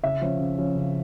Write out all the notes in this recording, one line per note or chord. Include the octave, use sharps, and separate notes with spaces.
C#3 E5
F3 C#4
C#3
F3 C#4
C#3